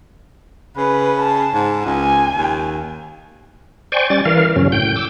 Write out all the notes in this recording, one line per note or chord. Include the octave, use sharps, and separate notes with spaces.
C#3 B4
A5
G#2
C#2 G#5
D#2
C5 D5 G5 G#5 C#6
G3 C#4 D5 A6
E3 A#4 F5
F#2 C#3 F#3 C#4
A2 G5 G6
D6 E6